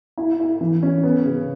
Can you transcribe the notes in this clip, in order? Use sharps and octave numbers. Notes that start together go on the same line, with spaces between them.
E4
E4
E3
C#4
B3
C#3